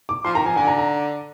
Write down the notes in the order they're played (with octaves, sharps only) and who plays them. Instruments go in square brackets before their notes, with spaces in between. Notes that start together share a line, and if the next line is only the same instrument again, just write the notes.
[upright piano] D6
[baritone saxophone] F3 [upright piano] C6
[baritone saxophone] D#3 [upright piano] A#5
[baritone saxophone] F3 [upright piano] G#5
[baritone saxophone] D3 [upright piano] G#5
[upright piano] A#5
A#5